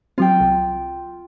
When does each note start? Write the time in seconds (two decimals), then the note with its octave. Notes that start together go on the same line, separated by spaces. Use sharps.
0.18 F#3 C4 F4 G5
0.40 C2